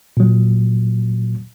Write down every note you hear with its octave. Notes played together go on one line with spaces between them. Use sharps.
A#2 F#3